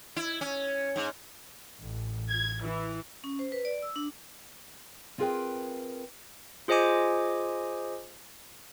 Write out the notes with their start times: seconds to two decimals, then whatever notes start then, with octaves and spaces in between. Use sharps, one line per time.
0.16 E4
0.41 C#4
0.96 G#2
1.80 A1
2.30 G#6
2.64 E3
3.24 C#4
3.39 C5
3.52 B4
3.65 D5
3.82 E6
3.96 D4
5.18 C4 F4 G#4 A#4 B4 G5
6.68 F4 G#4 C5 D#5 G#5 D6